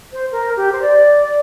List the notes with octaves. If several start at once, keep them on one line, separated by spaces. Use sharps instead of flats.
C5
A#4
G4
C5
D5